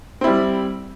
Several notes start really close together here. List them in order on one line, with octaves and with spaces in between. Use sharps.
C4 E4 G3